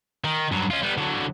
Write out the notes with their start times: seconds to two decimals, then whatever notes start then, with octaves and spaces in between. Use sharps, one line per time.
0.24 D#3
0.52 G2 F#3
0.71 C#4 F4
0.83 G3 B3
0.98 D3 F#3